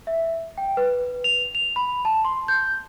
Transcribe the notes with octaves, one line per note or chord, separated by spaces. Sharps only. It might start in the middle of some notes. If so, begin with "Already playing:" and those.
E5
G5
B4
F7
F7
B5
A5
C6
G6